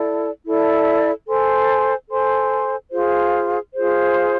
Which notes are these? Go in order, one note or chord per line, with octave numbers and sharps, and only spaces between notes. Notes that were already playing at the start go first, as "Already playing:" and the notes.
Already playing: E4 A4 D5 A5
E4 A4 D5 A5
A4 C5 G#5 C6
A4 C5 G#5 C6
F4 G#4 C5
F4 G#4 C5